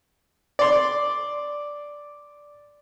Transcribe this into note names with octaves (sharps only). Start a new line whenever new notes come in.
D5 C6